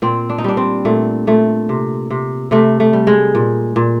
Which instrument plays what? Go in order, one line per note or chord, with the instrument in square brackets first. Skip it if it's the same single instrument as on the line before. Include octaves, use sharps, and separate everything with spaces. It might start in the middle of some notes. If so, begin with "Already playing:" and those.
[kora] A#2 C4
D4
D#4
G3 D4
C4
A#2 A3
A#2 A3
C3
C3
C3 A3
A3
G3
G#3
A#2
A#2